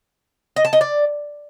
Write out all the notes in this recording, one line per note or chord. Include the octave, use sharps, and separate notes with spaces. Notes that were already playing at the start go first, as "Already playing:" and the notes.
D#5
A5
D#5
D5